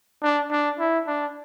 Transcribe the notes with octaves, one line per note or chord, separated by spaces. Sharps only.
D4
D4
E4
D4